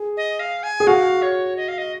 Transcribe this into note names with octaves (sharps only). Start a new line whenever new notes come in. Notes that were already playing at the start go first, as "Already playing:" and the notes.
Already playing: G#4
D#5
F5
G#5
G#4
F#4 F5
C#5
D#5
F5
D#5